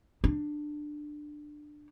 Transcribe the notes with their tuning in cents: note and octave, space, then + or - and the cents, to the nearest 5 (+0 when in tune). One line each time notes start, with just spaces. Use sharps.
D4 +15